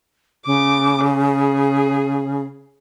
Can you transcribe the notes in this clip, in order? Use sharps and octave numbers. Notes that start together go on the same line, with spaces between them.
C#3 D6
G#4